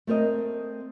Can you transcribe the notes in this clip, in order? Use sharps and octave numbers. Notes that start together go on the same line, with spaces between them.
A3 C4 A#4 D#5